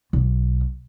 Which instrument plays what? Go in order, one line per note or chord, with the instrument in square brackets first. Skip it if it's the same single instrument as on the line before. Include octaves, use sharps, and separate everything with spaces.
[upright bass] B1